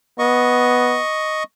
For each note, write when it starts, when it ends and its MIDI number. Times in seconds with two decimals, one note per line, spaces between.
0.19 1.01 59
0.19 1.43 75
0.19 1.43 85